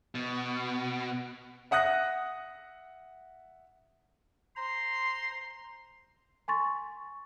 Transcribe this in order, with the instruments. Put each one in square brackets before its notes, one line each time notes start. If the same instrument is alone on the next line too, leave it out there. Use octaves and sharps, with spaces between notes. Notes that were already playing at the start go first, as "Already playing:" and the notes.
[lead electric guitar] B2
[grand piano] E5 F#5 D#6 F#6 A#6
[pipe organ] C5 A#5 [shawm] C6
[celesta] G#5 C6 C#6 A6